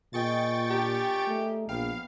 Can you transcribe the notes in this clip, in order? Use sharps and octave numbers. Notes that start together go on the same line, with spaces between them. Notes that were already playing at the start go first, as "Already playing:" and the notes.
A#2 F4 G#4 D#5 G5 C#6 A6
A#3 D4 G4
A3
A#1 B3 B4 F5 G5